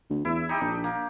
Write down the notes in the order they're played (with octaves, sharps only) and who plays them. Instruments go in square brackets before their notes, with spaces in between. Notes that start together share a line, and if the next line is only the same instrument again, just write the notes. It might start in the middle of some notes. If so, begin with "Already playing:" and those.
[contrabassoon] D2
[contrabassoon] E2 [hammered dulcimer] E4 E5
[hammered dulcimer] D#4 G4
[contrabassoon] A#1 [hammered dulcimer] D4
[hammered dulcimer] A#3